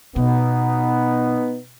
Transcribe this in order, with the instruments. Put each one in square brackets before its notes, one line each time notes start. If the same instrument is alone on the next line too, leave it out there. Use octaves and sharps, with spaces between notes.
[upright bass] B2 [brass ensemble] B3 D#4